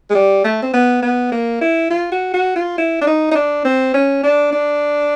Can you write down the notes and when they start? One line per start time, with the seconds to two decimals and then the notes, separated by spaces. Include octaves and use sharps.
0.10 G#3
0.15 G3
0.44 A3
0.62 C4
0.74 B3
1.03 B3
1.32 A#3
1.61 E4
1.90 F4
2.12 F#4
2.34 F#4
2.56 F4
2.78 E4
3.02 D4
3.07 D#4
3.31 D#4
3.35 D4
3.65 C4
3.94 C#4
4.24 D4
4.53 D4